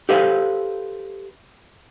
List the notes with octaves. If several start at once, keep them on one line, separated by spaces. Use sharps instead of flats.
G4 A4 B4 C5 D#5 F5